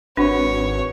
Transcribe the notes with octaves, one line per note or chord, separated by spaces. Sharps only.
G#1 C4 D4 F#4 B4 C#5